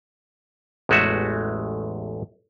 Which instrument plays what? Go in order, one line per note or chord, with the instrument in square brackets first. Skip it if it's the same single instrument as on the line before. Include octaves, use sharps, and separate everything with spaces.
[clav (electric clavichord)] A1 E2 G#3 A3 F#4 E5